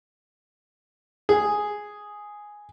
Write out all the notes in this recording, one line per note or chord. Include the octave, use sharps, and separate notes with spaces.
G#4